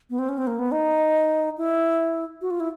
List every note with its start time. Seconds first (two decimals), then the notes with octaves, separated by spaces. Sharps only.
0.10 B3
0.19 C4
0.29 C#4
0.38 C4
0.47 A#3
0.59 B3
0.72 D#4
1.58 E4
2.41 F#4
2.51 F4
2.60 E4